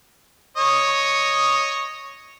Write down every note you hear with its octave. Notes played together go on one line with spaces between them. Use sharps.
C#5 D#5